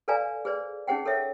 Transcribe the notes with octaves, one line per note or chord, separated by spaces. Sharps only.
A4 B4 D5 F5 G#5 A#5
G#4 B4 C5 D5
C#4 D#4 G#4 C5 F#5 G5
A4 A#4 C#5 E5